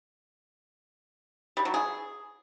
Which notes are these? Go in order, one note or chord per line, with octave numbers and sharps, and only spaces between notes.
G3
F#3
G#4